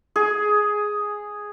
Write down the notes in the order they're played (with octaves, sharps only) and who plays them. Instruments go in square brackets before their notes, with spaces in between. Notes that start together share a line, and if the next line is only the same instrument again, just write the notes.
[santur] G#4